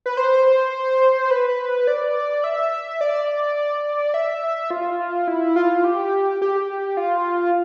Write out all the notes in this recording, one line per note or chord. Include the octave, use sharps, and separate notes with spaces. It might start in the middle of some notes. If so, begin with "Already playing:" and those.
B4
C5
B4
D5
E5
D5
E5
F4
E4
F4
G4
G4
F4